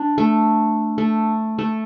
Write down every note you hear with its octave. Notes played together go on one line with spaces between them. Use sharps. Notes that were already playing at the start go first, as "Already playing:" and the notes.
Already playing: D4
A3
A3
A3